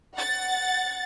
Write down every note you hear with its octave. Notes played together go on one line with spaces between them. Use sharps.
F#5 A6